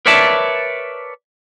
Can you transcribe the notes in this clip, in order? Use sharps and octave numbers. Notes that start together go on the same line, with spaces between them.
A#4 B4 C#5 D5 E5 A5